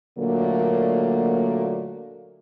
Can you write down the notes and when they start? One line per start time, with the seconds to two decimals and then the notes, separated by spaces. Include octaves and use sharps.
0.19 A#2 D3 F#3 A3 A#3